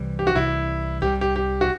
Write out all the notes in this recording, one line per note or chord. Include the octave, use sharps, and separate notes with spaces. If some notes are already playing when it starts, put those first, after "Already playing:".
Already playing: C2 C3 E3 G3
G4
F#4
C2 C3 E3 G3 E4
C2 C3 E3 G3 G4
G4
G4
F#4